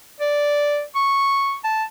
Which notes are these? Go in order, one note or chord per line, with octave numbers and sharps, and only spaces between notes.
D5
C#6
A5